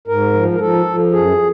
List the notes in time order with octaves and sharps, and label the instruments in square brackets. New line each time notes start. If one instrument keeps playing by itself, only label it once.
[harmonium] G#2 A#4
F3
A#4
F3 A4
F3
F#2 G#4